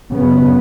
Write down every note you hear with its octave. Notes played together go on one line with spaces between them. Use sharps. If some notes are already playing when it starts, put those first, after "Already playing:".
F#2 C#3 B3